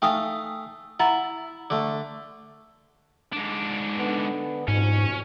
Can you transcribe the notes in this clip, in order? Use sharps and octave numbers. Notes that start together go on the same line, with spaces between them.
A3 D#4 F5 G5 G#5 D#6
E4 F#5 A#5 A6
D3 A3
G#2 D4
D3 B3
A1 F2 G#2 B2 C#4